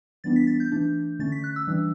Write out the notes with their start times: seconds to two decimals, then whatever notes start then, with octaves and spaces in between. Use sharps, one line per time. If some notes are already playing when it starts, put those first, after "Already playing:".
0.24 E3 G3 B3 D4 A6
0.36 B6
0.47 A6
0.60 G6
0.72 E3 A3 D4
1.19 D3 A3 C#4 A6
1.32 B6
1.44 F#6
1.56 E6
1.68 E3 G3 D4